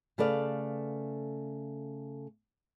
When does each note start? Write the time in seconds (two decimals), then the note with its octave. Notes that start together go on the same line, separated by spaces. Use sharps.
0.18 C#3 A3 A4 B4 D5 F5